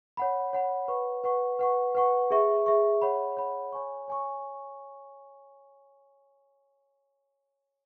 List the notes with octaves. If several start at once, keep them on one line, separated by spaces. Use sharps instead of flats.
C#5 F#5 B5
C#5 F#5 B5
B4 F#5 C#6
B4 F#5 C#6
B4 F#5 C#6
B4 F#5 C#6
G#4 E5 C#6
G#4 E5 C#6
C#5 F#5 B5
C#5 F#5 B5
C#5 G#5 C#6
C#5 G#5 C#6